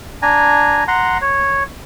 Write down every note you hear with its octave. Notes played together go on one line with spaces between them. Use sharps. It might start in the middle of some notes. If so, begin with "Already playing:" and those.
D4 G#5 A#5
F#5 A#5 C6
C#5